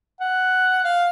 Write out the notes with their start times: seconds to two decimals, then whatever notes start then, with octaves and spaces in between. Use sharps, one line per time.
0.21 F#5
0.84 F5